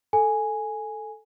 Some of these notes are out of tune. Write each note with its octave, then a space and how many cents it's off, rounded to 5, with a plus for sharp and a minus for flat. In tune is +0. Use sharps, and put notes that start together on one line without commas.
A4 +0 G#5 +0